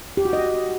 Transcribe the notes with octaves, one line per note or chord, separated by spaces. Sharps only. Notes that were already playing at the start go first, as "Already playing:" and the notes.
G4
F#4
D#5